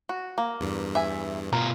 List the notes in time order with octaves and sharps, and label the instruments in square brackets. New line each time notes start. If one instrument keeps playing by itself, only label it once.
[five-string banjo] F#4
A#3
[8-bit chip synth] E2 G2
[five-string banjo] E5 G#5
[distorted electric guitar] B2 F4 [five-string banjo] A#4